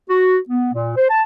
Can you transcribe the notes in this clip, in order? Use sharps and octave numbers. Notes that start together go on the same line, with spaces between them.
F#4
B3
A#2
C5
A5